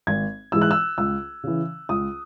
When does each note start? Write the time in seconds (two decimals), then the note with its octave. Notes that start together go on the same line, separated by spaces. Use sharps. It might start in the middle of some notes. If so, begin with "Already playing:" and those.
0.07 G#1 G#6
0.52 G#2 E3 G#3 E6
0.62 F#6
0.71 E6
0.98 C#2 E6
1.44 C#3 E3
1.89 C#2 D#6